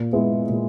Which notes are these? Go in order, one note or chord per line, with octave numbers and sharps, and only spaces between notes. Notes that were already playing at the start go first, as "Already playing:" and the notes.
Already playing: A#2
G#3 B3 E4
A#2